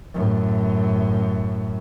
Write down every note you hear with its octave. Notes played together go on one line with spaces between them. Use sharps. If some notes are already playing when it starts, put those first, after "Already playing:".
F#2 A2